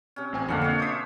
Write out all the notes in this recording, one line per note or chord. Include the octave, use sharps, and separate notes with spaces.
C3 C#4
A1 C4 G#5
F2 D3 A#3 A4 F5 F#5
B2 C#5
C5 E5 D6 D#6